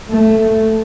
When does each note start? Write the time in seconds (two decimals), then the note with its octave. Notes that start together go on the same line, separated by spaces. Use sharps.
0.11 A3